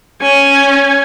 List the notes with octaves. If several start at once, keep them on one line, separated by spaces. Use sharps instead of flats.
C#4 G#5